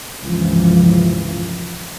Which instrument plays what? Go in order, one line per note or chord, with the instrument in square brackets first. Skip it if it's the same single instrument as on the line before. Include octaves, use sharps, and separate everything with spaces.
[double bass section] F1 C#2 G2 A#2 E3 F3